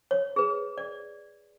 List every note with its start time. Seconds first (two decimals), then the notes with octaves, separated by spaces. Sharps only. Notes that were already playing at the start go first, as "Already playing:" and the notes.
0.11 C#5
0.36 G#4 B4
0.78 D5